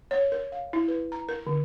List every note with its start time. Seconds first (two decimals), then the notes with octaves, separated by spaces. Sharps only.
0.11 C#5
0.32 A#4
0.52 F5
0.73 E4
0.88 B4
1.12 A#5
1.29 A#4
1.47 D3